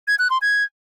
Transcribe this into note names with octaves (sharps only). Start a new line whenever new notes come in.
G#6
F#6
C6
G#6